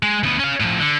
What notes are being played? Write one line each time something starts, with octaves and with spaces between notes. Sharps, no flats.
G#3
D2 B3
C#4 F5
A2 F3
D3